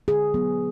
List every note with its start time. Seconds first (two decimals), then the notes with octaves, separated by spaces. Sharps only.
0.08 D3 G#4
0.34 F#3 B3